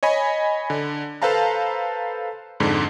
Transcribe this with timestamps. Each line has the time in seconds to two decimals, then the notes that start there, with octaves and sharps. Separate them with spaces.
0.03 C#5 D#5 G#5 B5
0.70 D3
1.22 A4 B4 C5 F5 A5 A#5
2.60 F2 G#2 D3